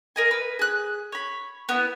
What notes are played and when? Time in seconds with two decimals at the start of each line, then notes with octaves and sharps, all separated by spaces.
0.16 A#4 D#5 G#5
0.31 B4
0.59 G#4 F#6
1.12 C#5 B5
1.69 B3 E4